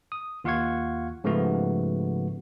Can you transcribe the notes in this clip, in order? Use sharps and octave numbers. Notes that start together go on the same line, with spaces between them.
D#6
D#2 F4 F5 F#5 C#6 G#6
G#2 C#3 F3 A3 B3 F#4